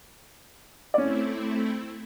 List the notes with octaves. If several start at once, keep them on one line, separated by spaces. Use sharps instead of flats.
A3 C4 C#4 E4 D5